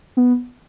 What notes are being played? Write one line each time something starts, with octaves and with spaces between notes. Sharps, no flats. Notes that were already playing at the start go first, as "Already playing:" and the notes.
B3